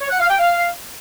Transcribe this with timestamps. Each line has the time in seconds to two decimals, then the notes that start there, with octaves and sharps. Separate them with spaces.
0.01 C#5
0.10 F#5
0.20 F5
0.29 G5
0.39 F5